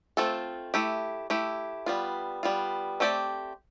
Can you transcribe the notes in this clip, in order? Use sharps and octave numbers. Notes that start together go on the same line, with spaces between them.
A3 C4 F4 A4
A3 E4 G4
A3 E4 G4
G3 B3 F4
G3 B3 F4
A3 C4 G4 D5